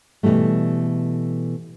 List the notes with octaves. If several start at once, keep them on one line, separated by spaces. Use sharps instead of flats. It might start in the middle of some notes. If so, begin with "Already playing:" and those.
B2 D3 E3 G3 A3